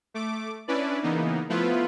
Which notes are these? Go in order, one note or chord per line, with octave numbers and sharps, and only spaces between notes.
A3 D6
C#4 D4 E4 B4 D5
C#3 E3 A#3 B3 D#4
F3 A3 B3 E4 F4 B4